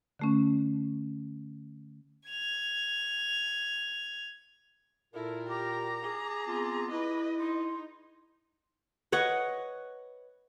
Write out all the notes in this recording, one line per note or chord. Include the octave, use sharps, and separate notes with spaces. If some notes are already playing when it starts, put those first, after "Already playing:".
D3 A3 C#4
G#6 F7
A#2 E4 F4 A4 A#4
G4 A#5 D6
G#4
B3 C4 F4
E4 B4 D#5
D#4 C6
B4 C#5 D#5 F#5